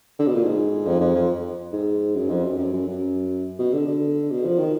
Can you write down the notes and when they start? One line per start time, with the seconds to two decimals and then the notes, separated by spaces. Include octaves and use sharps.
0.19 D3
0.27 B2
0.35 A#2
0.43 G#2
0.86 F2
1.00 F2
1.15 F2
1.72 G#2
2.15 F#2
2.29 F2
2.44 F#2
2.58 F#2
2.72 F#2
2.87 F#2
3.59 B2
3.73 D3
3.87 D3
4.31 B2
4.45 F3
4.58 D#3